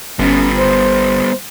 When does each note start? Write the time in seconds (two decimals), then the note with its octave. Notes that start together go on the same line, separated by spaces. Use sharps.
0.19 G1 G3 B3 C#4
0.55 C5